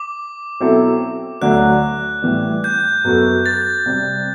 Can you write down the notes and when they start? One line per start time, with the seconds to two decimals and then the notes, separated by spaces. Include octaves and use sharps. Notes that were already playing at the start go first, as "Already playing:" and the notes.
Already playing: D6
0.60 B2 F#3 C4 E4 A4
1.41 D2 D3 F#3 A3 F#6
2.22 A2 E3 G3
2.64 G6
3.04 F#2 F#3 B3 F#4 A4
3.46 A6
3.86 C3 G3 C4